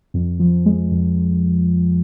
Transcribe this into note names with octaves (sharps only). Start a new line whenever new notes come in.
F2
F3
G#3
F2